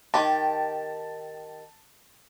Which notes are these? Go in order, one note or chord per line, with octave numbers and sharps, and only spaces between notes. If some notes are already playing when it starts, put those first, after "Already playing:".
D#3 G4 A5